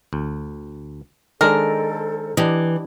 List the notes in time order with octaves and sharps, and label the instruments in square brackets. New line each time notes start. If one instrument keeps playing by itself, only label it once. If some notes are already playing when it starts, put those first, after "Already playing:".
[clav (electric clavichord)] D2
[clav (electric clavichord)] D#3 G#3 D4 [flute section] A4 C5 [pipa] A#4
[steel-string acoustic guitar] E3 [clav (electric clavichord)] D4 G4 D#5